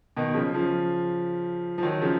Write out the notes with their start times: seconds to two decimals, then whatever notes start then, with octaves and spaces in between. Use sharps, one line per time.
0.17 B2 D#3
0.34 C#3 F3
0.53 C#3 F3
1.78 F3
1.83 D#3 F#3
2.01 C#3 F3